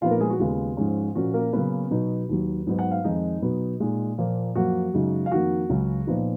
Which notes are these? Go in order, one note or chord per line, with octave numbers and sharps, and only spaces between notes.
A#2 F3 B3 D#4 F4 F5
A#3 A#4
G#3 G#4
F#4
D#2 C#3 G#3 B3 F4
G#2 F3 G#3 C#4
A#2 F3 A#3 C#4 F#4
A#3 A#4
C#3 F#3 A#3 B3 C#4 B4
B2 F#3 B3 D#4
D#2 D#3 F#3
G#2 F#3 B3 D#4
F#5
F5
F2 D#3 G#3 D#4 D#5
B2 F#3 B3 D#4
A#2 G#3 D#4
A#2 F3 A#3
F#2 F3 A#3 F#4 F#5
F#2 C#3 G#3 D#4
F5
F2 D#3 A#3 F#4 F#5
C#2 C#3 F#3 C#4
A#2 F3 B3 D#4